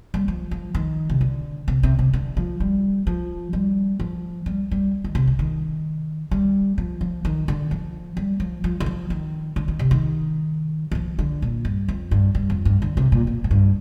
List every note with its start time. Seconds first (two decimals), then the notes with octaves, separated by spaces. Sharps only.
0.14 G3
0.28 F3
0.51 F3
0.75 D#3
1.10 C3
1.21 D3
1.68 C3
1.83 C3
1.99 C3
2.13 D3
2.37 F3
2.60 G3
3.07 F3
3.53 G3
4.00 F3
4.46 G3
4.71 G3
5.04 D#3
5.15 C3
5.27 D3
5.39 D#3
6.31 G3
6.78 F3
7.01 F3
7.25 D#3
7.48 D3
7.71 F3
8.17 G3
8.40 F3
8.64 F3
8.80 D#3
8.86 F3
9.10 D#3
9.56 D3
9.68 D#3
9.79 C3
9.91 D#3
10.92 G3
10.95 F3
11.19 D3
11.42 A#2
11.65 G2
11.88 F2
12.11 G2
12.35 G2
12.50 F2
12.65 G2
12.82 D3
12.97 C3
13.12 A#2
13.27 A#2
13.44 G#2
13.51 G2